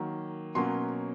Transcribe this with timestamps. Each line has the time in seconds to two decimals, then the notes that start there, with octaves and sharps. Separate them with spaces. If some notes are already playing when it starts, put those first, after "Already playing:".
Already playing: D#3 F#3 A#3
0.55 B2 F#3 A#3 C#4 C6